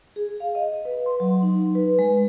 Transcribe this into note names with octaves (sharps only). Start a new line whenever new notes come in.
G#4
F5
D#5
B4
C6
F#3
D#4
B4
G#3